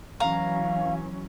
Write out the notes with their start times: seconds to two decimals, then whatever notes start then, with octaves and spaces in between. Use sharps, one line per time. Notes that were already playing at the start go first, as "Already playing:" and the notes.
0.20 E3 F#3 C#4 F5 A#5